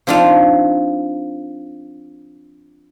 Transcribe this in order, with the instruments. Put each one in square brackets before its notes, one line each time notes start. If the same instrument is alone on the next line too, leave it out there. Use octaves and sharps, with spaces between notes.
[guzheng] F3 C4 D4 D#4 F4